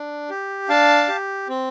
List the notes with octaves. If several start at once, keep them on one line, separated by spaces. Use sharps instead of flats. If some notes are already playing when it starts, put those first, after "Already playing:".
Already playing: D4
G4
D4 F5 A5
G4
C4